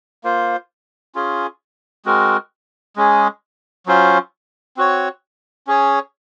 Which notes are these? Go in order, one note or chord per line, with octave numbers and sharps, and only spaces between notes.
A#3 F4 C5
C#4 F4 G#4
G#3 C4 F#4 A#4
G#3 C#4 G#4
F#3 C#4 F4 C5
C4 F#4 C#5
C#4 G#4 C#5